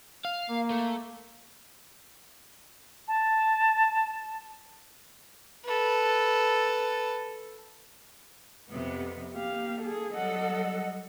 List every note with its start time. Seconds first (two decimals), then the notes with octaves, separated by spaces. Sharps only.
0.25 F5
0.50 A#3
0.70 A3
3.08 A5
5.66 A4 B4
8.69 F2 C3 B3
9.34 A#3 G4 F5
9.81 G#4 A4
10.15 F#3 G3 A4 D#5 F#5